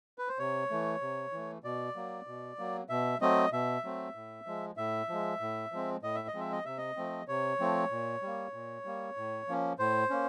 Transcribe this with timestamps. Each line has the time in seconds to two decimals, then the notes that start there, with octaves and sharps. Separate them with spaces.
0.18 B4
0.28 C5
0.39 C3 C#5
0.70 E3 A3
1.01 C3
1.33 E3 A3
1.64 B2 D5
1.96 F#3 A#3
2.27 B2
2.59 F#3 A#3
2.89 B2 E5
3.21 F#3 A3 C4 D#5
3.52 B2 E5
3.84 F#3 A3 C4
4.15 A2
4.46 F3 G#3
4.77 A2 E5
5.09 F3 G#3
5.40 A2
5.72 F3 G#3 C4
6.03 A2 D#5
6.15 E5
6.28 D#5
6.34 F3 G#3 C4
6.40 E5
6.52 D#5
6.65 C3 E5
6.77 D#5
6.97 F3 A3 C4
7.28 C3 C#5
7.60 F3 A3 C4
7.91 A#2
8.22 G3 A#3
8.53 A#2
8.85 G3 A#3
9.17 A2
9.48 F3 A#3 C#4
9.79 A2 C5
10.10 A#3 C#4